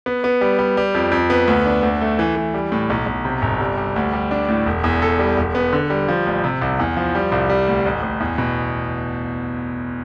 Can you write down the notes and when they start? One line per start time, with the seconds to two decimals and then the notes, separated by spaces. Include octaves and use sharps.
0.06 B3
0.24 B3
0.41 G3
0.59 G3
0.77 G3
0.95 F2
1.12 F2
1.30 B3
1.48 D2
1.66 D4
1.83 D2
2.01 A3
2.19 E3
2.36 E3
2.54 G3
2.72 A2
2.90 B1
3.06 B1
3.25 C3
3.42 G1
3.60 G3
3.77 G3
3.96 D2
4.13 G3
4.31 D4
4.49 A2
4.66 E1
4.84 E2
5.02 A4
5.19 G3
5.37 E1
5.55 B3
5.73 D3
5.90 G3
6.08 F3
6.26 A1
6.44 C3
6.62 C2
6.79 E2
6.97 F3
7.15 G3
7.32 C2
7.50 G3
7.68 D2
7.86 A1
8.03 A1
8.20 E2
8.38 B2